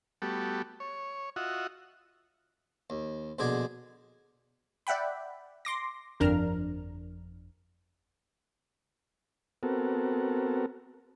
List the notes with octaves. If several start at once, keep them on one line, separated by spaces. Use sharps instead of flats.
G3 A3 B3 F#4 G4 A4
C#5
F4 F#4 D#5 E5 F#5
D#2
A#1 B2 D3 G#4 D5 G#5
D5 E5 F#5 G5 B5
C6 D6 A#6
G1 F2 D4 A#4 A#5 F6
B3 C4 F#4 A4 A#4